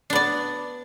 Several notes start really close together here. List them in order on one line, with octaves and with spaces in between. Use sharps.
D4 B3 D5